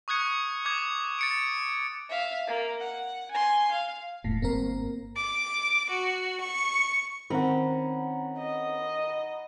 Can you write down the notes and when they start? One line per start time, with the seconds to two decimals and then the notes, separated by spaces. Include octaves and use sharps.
0.08 C#6 D#6 F#6 G#6 C#7
0.65 D6 D#6 G#6
1.19 A6 C#7 D7
2.09 E5 F5
2.47 A#3
2.80 F#5
3.31 G#5 C6
3.72 F5
4.24 E1 A2
4.42 G1 A#3 C4 A#4
5.17 D6
5.90 F#4
6.40 C#6
7.30 D#3 C4 C#4 F#5 A#5 B5
8.38 D#5